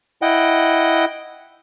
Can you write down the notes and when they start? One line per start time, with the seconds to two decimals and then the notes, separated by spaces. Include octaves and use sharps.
0.22 E4 D#5 F#5 G5